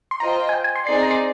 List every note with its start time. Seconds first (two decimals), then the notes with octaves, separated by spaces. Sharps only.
0.11 C6
0.20 F4 C5 D#5 G5 A#5
0.49 G#5
0.53 G5
0.64 G#5
0.76 C6
0.87 C4 D#4 G#4 D5 C6
1.03 A#5
1.11 C6